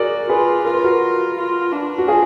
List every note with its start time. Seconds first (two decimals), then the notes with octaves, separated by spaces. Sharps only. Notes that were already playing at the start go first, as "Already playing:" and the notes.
Already playing: F#4 G#4 A#4 D5
0.29 F4 G#4 B4
0.65 F4 A#4
0.74 B4
0.84 F#4 A#4
1.37 F4
1.72 D4
1.98 F#4
2.08 F4 G#4